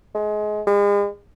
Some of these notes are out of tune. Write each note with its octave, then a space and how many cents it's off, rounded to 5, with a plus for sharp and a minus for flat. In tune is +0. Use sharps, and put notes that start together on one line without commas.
G#3 +25
G#3 -40